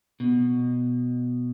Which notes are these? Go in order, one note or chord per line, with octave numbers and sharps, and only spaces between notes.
B2